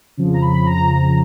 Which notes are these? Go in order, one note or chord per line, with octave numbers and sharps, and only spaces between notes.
F2 C#3 F3
A#5
B5
A#5